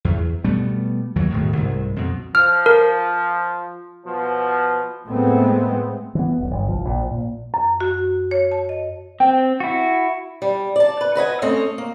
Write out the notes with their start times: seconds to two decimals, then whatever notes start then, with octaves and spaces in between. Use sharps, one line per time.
0.05 E2
0.44 B2 G3 A3 B3
1.16 D#2 E3 F#3
1.30 E1 A2 D#3
1.55 C2 G#2
1.96 F2 B2
2.35 F3 F6
2.66 A#4
4.05 B2 F3
5.06 A2 G#3 A3 B3 C4
6.15 E3 B3
6.38 D#1 B1
6.51 G1
6.68 C2 F3
6.85 A#1
7.11 A#2
7.54 F#2
7.80 F#4
8.31 C#5
8.51 A5
8.69 D#5
9.20 C4 G5
9.60 E4 F#4
10.42 G3
10.76 D5 A5
11.01 B4
11.15 F#4 B4 D#5 G#5
11.42 A3 C4 C#4 D#5
11.78 A#3